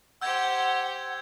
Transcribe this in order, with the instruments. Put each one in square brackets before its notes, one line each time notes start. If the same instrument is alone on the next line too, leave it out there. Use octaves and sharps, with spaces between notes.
[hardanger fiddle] G4 C5 [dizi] F#5 [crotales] E6 G6 G#6